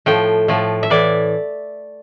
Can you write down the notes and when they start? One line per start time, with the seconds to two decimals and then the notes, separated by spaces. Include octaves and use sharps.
0.06 A2 F3 A3 G5
0.48 A2 F3 A3
0.83 E5
0.90 A2 E3 D5